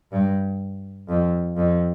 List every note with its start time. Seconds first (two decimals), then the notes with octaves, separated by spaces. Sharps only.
0.12 G2
1.09 F2
1.57 F2